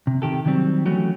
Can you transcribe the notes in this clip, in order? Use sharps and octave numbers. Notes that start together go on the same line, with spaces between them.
C3
C3 D#3 G4 A4
D3 D#3 F#3 G3 C4
E3 F#3 A3 C#4 F#4 G4